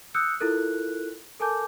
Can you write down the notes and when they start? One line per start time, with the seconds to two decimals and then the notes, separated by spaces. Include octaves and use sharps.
0.14 D#6 E6 F#6 G6 C#7
0.40 E4 F4 A4 A#4 F#6
1.40 A4 A#4 G#5 A5 D6 G6